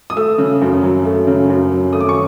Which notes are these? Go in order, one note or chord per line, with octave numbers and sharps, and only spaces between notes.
D#6
A3 E6
C#3
F#2
F#3
A3
C#3
F#2
F#3
A3 D#6
D6
C#6